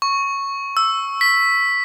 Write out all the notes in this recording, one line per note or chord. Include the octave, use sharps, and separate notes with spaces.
C#6
E6
B6